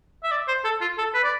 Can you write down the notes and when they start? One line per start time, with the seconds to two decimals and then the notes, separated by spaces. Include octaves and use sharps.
0.24 E5
0.31 D5
0.48 C5
0.65 A4
0.81 F4
0.98 A4
1.15 B4
1.24 D5